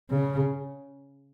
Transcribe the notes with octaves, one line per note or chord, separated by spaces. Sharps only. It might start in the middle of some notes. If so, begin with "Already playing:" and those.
C#3